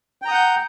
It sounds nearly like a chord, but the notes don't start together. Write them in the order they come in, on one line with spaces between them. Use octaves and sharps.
G5 A#5 D#6 F#5 G6